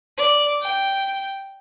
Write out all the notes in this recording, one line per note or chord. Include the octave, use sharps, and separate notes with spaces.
D5
G5